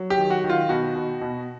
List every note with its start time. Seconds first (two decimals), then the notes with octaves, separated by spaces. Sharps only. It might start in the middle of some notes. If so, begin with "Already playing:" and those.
Already playing: F#3
0.10 G4
0.17 D#3
0.30 F#4
0.44 D#3
0.50 F4
0.69 B2 F#4
0.95 B2
1.21 B2